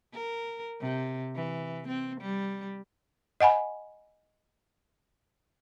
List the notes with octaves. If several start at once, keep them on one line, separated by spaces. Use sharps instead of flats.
A#4
C3
E3
C4
G3
D#5 F#5 G#5 B5